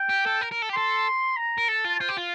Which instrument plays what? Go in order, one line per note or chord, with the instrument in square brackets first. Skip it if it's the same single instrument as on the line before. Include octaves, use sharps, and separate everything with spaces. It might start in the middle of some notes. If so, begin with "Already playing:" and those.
Already playing: [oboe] G5
[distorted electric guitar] G4
A4
A#4
A#4
A4
G4
[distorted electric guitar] A4 [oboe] C6
[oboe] A#5
[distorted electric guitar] A#4
[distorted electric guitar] A4 [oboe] A5
[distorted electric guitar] F4
[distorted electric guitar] F4 [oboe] C5
[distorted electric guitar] G4
F4